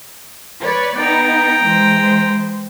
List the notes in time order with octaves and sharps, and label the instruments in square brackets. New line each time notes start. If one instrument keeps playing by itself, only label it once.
[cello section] B4 C#5 D5
[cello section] B3 D#4 [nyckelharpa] G5 A#5
[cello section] E3 G#3 C5